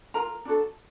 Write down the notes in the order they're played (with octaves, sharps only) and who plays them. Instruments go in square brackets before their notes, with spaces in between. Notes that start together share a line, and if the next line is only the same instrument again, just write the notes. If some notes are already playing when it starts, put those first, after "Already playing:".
[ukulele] F4 A#4 A#5
D4 F#4 A4